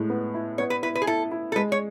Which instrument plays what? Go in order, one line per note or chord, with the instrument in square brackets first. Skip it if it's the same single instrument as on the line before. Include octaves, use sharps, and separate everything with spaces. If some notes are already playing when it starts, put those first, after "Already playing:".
Already playing: [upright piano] A2 G#3
B3
E4
[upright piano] B3 [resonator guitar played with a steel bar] C#5
[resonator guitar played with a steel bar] B4
[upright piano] E4 [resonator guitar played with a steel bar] B4
[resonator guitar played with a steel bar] B4
G#4
[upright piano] E4 [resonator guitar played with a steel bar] A4
[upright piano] E4
[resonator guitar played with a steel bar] A4
[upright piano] G#3 [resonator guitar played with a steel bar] B4
[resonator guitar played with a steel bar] C#5